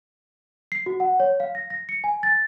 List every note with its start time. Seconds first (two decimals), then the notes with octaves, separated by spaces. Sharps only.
0.72 C7
0.86 F#4
1.00 F#5
1.20 C#5
1.40 F5
1.55 A#6
1.70 A#6
1.89 C#7
2.04 G#5
2.23 A6